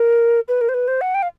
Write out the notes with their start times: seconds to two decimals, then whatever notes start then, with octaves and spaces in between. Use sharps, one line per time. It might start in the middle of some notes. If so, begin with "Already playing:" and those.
Already playing: A#4
0.48 B4
0.61 A#4
0.69 C5
0.74 B4
0.88 C5
1.01 F#5
1.15 G5
1.23 F5